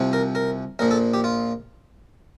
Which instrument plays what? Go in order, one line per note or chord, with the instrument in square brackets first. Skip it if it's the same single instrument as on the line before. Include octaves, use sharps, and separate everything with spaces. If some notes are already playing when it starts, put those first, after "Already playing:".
Already playing: [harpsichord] C2 C3 F3
A#4
A#4
A#1 A#2 F3 A#4
A4
G4
F4